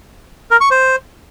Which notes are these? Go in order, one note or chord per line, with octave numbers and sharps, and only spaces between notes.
A#4
C#6
C5